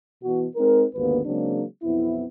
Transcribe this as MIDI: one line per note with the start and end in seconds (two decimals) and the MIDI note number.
0.24 0.45 47
0.24 0.45 52
0.24 0.45 66
0.56 0.84 56
0.56 0.84 60
0.56 0.84 63
0.56 0.84 70
0.95 1.19 32
0.95 1.19 39
0.95 1.19 50
0.95 1.19 58
0.95 1.19 59
0.95 1.19 71
1.24 1.63 49
1.24 1.63 54
1.24 1.63 56
1.24 1.63 58
1.24 1.63 60
1.24 1.63 62
1.83 2.21 35
1.83 2.21 41
1.83 2.21 59
1.83 2.21 60
1.83 2.21 64